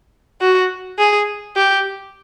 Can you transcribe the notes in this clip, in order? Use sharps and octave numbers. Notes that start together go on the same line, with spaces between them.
F#4
G#4
G4